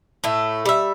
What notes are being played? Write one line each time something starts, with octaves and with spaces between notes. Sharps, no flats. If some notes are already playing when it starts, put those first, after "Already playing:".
A2 A3
G3 E5